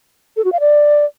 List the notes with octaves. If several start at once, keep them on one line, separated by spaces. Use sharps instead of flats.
A4
F#4
F5
D5